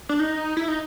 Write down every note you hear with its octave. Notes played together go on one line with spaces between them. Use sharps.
D4
D#4
E4
D#4